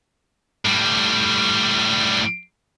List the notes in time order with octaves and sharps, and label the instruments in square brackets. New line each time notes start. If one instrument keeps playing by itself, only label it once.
[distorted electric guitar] A2 G3